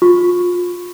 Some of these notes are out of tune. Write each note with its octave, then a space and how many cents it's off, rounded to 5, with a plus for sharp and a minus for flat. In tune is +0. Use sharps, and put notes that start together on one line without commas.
F4 +25 C#6 +0